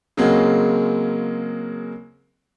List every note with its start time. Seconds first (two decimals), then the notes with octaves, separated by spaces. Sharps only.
0.17 C#3 F#3 G#3 A#3 C4